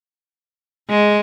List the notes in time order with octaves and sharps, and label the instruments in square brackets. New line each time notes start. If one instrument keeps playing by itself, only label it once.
[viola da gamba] G#3